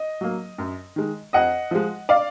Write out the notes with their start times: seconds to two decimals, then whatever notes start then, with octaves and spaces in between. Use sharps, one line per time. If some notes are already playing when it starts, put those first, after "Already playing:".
Already playing: D#5
0.21 F#3 A#3
0.58 F#2
0.96 D#3 G#3
1.33 F2 D#5 F#5
1.71 F3 G#3
2.09 D5 F5